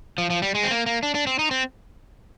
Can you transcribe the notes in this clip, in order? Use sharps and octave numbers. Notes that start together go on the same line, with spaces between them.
F3
F3
G3
G#3
C4
A#3
A#3
D4
D4
C4
D#4
C4